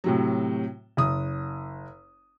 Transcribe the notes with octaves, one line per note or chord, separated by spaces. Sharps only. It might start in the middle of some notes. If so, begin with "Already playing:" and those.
A2 C3 F#3
F#1 D#6